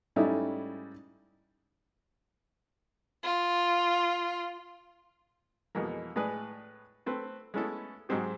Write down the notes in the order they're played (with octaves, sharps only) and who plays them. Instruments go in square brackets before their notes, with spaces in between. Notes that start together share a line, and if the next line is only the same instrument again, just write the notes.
[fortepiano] G#2 G3 A3 C#4 D#4 E4
[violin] F4
[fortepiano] F2 B2 E3 G#3 A#3
A2 G#3 G#4 B4 D5 G#5
A3 C4 B4
G#3 A3 B3 C#4 E4 A4
G#2 F#3 G#3 C4 G4